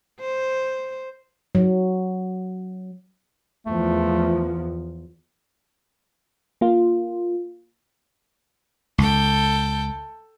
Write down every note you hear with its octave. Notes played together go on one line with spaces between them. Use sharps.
C5
F#3
E2 F3 A3
A#3 F4
C#2 A4 G5